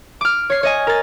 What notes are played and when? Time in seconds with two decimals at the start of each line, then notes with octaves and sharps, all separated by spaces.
0.21 D6 F6
0.50 C#5 C7
0.63 C#5 D#5 G#5
0.87 A#4 A6